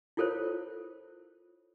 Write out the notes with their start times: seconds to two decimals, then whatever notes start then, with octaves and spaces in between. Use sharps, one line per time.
0.17 E4 F4 A4 A#4 C5 C#5